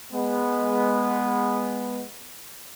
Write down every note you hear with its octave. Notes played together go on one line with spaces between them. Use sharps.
G#3 B3